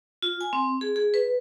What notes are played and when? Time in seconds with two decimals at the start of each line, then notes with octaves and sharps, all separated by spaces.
0.23 F4
0.41 G#5
0.53 C4
0.81 G#4
0.96 G#4
1.14 B4